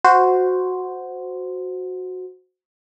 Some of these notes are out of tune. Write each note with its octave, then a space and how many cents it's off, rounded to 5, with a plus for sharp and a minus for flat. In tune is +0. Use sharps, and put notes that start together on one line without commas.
F#4 -10 C5 -10